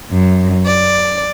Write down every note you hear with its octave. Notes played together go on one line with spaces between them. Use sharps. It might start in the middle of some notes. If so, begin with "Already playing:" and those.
F#2
D5